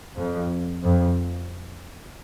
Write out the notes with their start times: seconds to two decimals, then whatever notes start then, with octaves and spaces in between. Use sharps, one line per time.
0.17 F2
0.83 F2